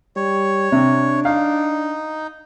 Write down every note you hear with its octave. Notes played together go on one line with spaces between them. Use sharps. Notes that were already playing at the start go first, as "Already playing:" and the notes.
G3 C#5
C3 D4
D#4 F5